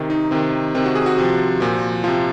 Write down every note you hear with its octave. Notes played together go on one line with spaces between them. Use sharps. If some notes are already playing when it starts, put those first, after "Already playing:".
Already playing: C3 D#3
D#4
C3 D#3 C4
C3 D#3 C4
F#4
G#4
F#4
C3 F3
A#2 F3
C3 F3 F4